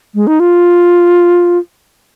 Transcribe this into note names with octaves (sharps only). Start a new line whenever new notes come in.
G#3
D#4
F4